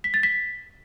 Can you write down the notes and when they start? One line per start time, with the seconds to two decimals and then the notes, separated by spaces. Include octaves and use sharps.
0.04 B6
0.14 A6
0.23 B6